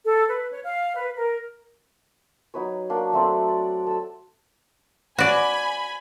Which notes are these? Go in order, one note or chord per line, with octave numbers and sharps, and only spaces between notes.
A4
B4
C#5
F5
B4
A#4
F#3 D#4 B4 C#5
A#3 D4 F#4
F#3 A3 C4 D5
D5
A4 E6
F#4 D5 G#5 B5